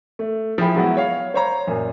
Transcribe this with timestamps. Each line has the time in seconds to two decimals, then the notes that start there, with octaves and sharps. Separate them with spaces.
0.19 A3
0.58 F3 E4 G#4 G5 B5
0.75 F#3 G#3 B3 E4 F#4
0.97 C#5 F5
1.34 C5 C#5 A#5
1.67 F#2 A#2